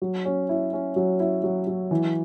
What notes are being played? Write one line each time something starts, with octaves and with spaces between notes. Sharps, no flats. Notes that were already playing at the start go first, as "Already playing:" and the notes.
F#3
C#4
E4
C#4
F#3
E4
F#3
F#3
E3